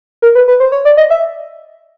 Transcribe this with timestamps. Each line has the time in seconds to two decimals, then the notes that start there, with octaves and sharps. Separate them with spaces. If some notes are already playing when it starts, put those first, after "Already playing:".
0.22 A#4
0.35 B4
0.48 B4
0.60 C5
0.72 C#5
0.85 D5
0.97 D#5
1.10 E5